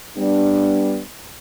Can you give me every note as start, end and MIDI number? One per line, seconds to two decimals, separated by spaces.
0.16 1.01 55
0.16 1.01 59
0.16 1.01 62